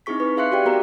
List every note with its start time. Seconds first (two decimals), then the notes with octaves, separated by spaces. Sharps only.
0.06 C4 D#4 E4 G#4 C#6 B6
0.20 B4 C#6
0.37 G#4 E5 F5 C6 F#6 C#7
0.52 F#4 G4 D5 G5
0.65 B3 F#4 G#4 A#4 A#5